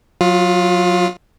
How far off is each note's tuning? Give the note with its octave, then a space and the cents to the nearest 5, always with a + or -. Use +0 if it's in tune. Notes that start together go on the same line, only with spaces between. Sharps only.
F#3 -25 F4 +10